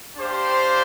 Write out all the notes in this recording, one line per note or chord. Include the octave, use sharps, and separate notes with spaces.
D4 G4 C5 F5